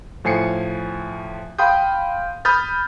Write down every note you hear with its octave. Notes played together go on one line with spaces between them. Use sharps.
A2 F3 G#5 C7 C#7
F5 G5 B5 C6 D#6 G6
B5 D#6 F6 G6 A6